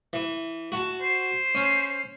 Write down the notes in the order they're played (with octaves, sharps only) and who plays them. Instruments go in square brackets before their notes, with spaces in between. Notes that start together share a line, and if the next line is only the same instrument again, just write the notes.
[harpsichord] E3
F#4 A5
[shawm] C5
[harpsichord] C#4